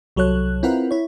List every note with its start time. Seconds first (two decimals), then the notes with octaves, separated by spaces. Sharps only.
0.16 C2 F#3 A4 C#5 F#6
0.63 C4 E4 F4 A#4 B4 F#5
0.91 E4 C#5